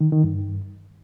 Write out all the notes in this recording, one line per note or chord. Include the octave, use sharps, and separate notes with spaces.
D#3
D#3
G2